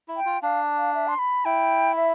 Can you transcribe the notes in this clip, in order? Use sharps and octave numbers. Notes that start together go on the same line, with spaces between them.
E4
G5
F4
D4 F5
F5
E5
C6
B5
E4 G5
E5